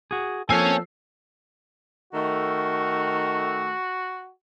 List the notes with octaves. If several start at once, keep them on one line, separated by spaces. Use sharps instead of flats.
F#4 G#4
F3 A#3 C4 A4 C#5 G#5 E6 C7
D#3 A3 F#4